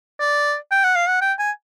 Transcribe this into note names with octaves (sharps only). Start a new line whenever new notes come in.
D5
G5
F#5
F5
F#5
G5
G#5